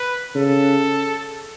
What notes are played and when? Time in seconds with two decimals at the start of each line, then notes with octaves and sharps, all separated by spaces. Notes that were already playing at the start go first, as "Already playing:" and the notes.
Already playing: B4
0.35 C#3 A4